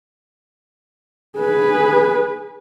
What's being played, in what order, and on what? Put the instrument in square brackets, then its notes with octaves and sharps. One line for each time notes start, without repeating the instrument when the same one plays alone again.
[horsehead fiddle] G#4 B4